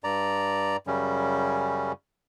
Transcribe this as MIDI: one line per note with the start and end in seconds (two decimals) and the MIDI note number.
0.04 0.77 43
0.04 0.77 74
0.04 0.77 82
0.87 1.92 42
0.87 1.92 49
0.87 1.92 55
0.87 1.92 61